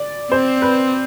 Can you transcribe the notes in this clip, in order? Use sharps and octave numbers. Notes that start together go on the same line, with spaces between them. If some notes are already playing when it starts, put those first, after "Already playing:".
Already playing: D5
C4 C5
B4